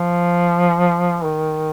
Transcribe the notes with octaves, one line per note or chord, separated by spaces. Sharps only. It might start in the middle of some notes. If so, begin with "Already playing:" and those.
Already playing: F3
D#3